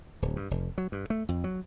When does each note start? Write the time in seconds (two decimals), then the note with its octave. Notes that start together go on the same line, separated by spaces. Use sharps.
0.22 D1
0.36 G2
0.51 F1
0.78 F#3
0.92 G2
1.10 A3
1.29 F2
1.44 F#3